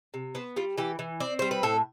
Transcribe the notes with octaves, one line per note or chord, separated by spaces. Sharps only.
C3
B3 C5
G3 F4
E3 G4
E3
C4 D5
G3 C5
B4
A2 A4